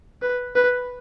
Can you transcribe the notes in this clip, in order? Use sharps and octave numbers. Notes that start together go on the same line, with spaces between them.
B4
B4